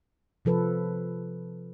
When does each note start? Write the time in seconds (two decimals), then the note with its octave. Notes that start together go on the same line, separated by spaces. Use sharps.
0.45 C3 F3 A4 B4